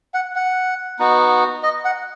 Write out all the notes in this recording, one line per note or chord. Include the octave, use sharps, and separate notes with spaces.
F#5
F#5
B3 D#4 F#4
D#5
F#5